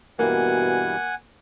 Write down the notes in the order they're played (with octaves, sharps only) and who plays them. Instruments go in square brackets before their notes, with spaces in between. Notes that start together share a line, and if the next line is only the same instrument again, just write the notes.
[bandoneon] G2 E3 [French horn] B2 [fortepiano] A#3 [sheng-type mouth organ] F#5 G#5